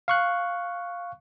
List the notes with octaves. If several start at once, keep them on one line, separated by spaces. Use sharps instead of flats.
F5 C#6 F#6